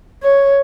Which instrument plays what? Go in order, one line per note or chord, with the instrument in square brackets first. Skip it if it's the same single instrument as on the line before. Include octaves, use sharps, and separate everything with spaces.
[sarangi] C#5